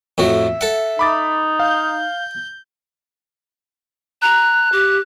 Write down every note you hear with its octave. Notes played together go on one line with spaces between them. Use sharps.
F2 A2 F#4 E5
A4 F#5
D#4 B5 D6 A6
F5 G6
A#5 F#6
G4